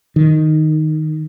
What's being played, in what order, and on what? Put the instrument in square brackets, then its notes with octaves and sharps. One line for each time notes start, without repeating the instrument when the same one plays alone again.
[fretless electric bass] D#3